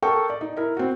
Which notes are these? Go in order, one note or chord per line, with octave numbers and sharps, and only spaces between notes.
A4 A#4 G5 C#6
D5
D#4
E4 A#4
C4 F#4